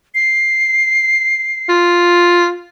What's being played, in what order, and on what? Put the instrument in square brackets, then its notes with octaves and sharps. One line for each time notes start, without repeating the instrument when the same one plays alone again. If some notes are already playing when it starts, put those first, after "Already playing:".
[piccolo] C7
[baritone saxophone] F4